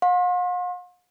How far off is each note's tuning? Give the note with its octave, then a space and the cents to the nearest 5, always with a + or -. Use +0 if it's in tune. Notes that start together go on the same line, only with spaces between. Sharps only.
F5 +45 C6 +35